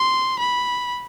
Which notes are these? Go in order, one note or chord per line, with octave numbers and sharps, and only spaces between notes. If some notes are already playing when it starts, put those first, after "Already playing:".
Already playing: C6
B5